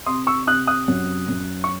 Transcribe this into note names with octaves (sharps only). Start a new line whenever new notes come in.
C3 C6 D#6
C#6 E6
C3 D#6 F#6
D#6 F#6
F#2
F#2
C#6